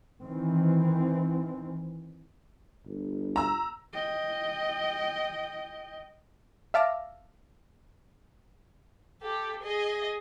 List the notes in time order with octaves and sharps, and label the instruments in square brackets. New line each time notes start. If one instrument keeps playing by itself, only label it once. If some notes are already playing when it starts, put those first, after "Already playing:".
[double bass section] D#3 E3 C4
[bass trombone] G1
[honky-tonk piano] A#5 E6
[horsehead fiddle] D#5 G5
[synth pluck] E5 F5 A5 D6 E6 A#6
[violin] G4 A4
G#4 D#5